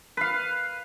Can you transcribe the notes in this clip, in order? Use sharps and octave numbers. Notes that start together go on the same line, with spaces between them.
B4 F5